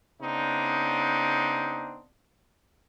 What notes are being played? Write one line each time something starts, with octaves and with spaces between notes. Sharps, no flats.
C#3 B3 C4 D4 D#4